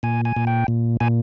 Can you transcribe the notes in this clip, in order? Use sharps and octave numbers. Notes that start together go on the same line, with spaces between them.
A#2 G#5
G#5
A#2
G5
A#2
A#2 G#5